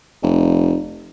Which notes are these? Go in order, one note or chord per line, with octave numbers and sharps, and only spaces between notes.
F1